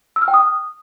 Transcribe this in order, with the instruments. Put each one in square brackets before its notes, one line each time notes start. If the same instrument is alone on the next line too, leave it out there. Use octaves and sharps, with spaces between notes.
[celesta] E6
F6
G5
D#6